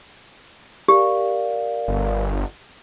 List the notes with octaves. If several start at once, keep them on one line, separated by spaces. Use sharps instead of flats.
G4 A#4 D5 F5
G1